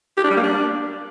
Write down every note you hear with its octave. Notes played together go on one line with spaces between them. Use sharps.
G4
D4
G3
A#3
D4